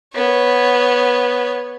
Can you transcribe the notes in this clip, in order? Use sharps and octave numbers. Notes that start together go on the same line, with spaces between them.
B3 C#5